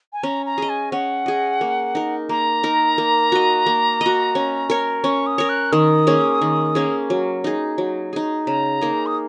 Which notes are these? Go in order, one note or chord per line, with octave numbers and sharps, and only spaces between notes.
G#5
C#4 A#5
A#5
G#4 D#5
G#5
C#4 F#5
G#4 D#5
A#3
D#4 A#4
A#3 A#5
D#4 A#4
A#3
F#4 D#5
A#3
F#4 D#5
C#4
A#4 C#5
C#4 C#6
D#6
A#4 C#5
F#6
D#3 D#6
A#3 C#4 G#4
D#3
A#3 C#4 G#4
F#3
D#4 G#4
F#3
D#4 G#4
C#3 A#5
A#3 D#4 G#4
D#6